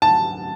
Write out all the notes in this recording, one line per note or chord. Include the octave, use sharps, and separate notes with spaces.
A5